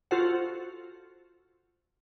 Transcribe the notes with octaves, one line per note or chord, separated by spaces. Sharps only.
F4 F#4 A4 C5 F#5